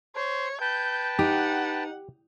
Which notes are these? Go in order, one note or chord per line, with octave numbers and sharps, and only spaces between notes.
C5 C#5
B4 G5 A5 G6
D#4 G4 F#5